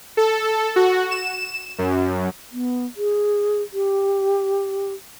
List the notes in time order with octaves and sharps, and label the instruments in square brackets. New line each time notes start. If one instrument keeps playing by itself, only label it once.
[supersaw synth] A4
F#4
E7
F#2
[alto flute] B3
G#4
G4